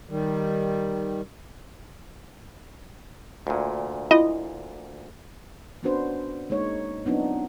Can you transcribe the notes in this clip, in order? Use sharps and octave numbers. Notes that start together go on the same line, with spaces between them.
D#3 G3
D2 A#2
E4 F4 D#5
B3 C#4 D4 F#4 B4 C5
G#3 A#3 D#4 C#5
F#3 B3 C4 D4 D#4 F4